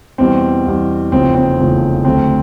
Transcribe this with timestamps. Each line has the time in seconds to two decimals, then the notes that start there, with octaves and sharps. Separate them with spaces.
0.18 E2 B2 G3 C4
0.65 E2 B2 G3
1.12 F1 E2 C#3 F3 C4
1.35 C4
1.59 F1 E2 C#3 F3
2.05 D2 D3 F#3 C4